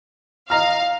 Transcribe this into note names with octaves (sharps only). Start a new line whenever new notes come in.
D#5 F5 A#5 F6